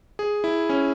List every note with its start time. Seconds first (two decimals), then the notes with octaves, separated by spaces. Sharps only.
0.19 G#4
0.44 E4
0.69 C#4